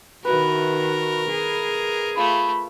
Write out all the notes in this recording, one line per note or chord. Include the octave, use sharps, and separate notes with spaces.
D#3 E4 F#4 A#4 B4
G#4
A3 F4 B5